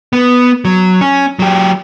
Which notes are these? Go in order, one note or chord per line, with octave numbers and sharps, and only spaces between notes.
B3
F#3
C#4
F#3 G4